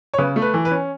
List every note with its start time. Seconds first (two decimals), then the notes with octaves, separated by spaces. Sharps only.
0.14 C#5
0.18 C#3 B4
0.36 A3
0.42 B4
0.54 E3
0.65 B4
0.71 C#4